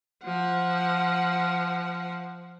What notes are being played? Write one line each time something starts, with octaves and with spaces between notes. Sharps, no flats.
F3 F#5